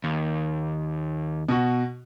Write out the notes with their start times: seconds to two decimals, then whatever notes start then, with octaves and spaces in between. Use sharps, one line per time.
0.04 D#2
1.49 B2 F#4